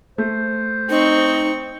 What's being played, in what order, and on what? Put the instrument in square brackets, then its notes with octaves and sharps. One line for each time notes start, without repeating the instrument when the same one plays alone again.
[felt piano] A3 [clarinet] C5
[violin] C4 C#6 [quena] D#4